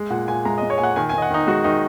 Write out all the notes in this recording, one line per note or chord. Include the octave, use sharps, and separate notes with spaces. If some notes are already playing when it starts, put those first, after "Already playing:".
Already playing: G#3
A#2 F#5
A#2 G#5
G#3 A#5
D#5
G#3
C#5
A#2 G#5
F#5
D#3 G#5
G#5
D#3 D#5
F#5
D#3 D#4
G#3 F#4
D#3 D#4